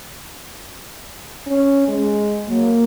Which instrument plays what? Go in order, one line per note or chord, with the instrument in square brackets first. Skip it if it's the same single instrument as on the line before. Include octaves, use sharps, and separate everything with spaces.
[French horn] C#4
G#3
[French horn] F#3 [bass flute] A#3